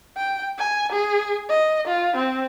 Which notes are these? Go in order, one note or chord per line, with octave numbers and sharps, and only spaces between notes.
G5
G#5
G#4
D#5
F4
C4